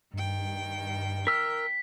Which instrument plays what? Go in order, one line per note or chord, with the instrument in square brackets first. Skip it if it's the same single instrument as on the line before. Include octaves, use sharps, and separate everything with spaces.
[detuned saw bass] G2 [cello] D#3 G5
[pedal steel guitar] A#4 E6 F6 [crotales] B6